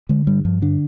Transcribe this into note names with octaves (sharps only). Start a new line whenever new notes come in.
D3 G#3
G2 G3
G2 F3
D3 D4